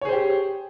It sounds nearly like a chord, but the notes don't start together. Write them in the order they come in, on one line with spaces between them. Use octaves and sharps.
C#5 G#4 C5 G4